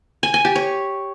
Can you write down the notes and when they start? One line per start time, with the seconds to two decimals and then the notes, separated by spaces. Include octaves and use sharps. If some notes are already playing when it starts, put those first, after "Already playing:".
0.23 G#5
0.34 G#5
0.45 G4
0.56 C#5